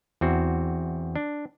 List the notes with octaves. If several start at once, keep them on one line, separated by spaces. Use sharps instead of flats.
E2 C4 F#4
D4